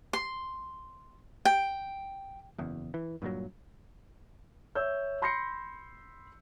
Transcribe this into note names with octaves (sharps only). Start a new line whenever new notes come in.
C6
G5
F#1 E2
E3
G2 A#2 D3 F#3
C#5 E5 E6 G6
B5 C6 G6 A#6 C7 C#7